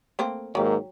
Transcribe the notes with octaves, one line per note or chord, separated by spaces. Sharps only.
A3 A#3 C4
G#2 D#3 F#3 A#3 G4